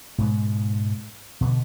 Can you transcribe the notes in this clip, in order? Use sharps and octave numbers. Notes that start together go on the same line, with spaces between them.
G#2 B2 G#3
B2 D3